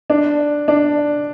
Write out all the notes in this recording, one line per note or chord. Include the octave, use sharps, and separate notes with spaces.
D4
D4